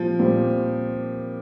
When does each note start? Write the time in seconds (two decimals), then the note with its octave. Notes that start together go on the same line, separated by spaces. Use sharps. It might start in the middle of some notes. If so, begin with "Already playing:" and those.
Already playing: A#2 F3 G3 C4
0.19 A#2 G3 C4